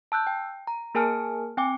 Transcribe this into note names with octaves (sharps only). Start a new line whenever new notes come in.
A5 E6 F#6 G6
G5
A#5
A#3 G#4 A#4 G#5 A5 F6
C4 G5 G#5 D6